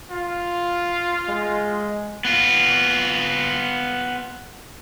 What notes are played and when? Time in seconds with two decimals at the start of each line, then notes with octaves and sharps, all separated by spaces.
0.11 F4
1.28 G#3
2.25 B3 F4